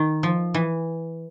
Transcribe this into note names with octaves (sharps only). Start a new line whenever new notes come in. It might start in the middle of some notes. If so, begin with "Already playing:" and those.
Already playing: D#3
F3
E3